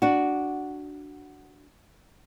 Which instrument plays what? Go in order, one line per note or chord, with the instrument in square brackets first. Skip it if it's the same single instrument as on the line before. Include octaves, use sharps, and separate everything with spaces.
[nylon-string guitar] D4 F#4